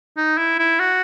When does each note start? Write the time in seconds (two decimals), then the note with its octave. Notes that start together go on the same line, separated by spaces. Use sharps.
0.17 D#4
0.38 E4
0.59 E4
0.80 F#4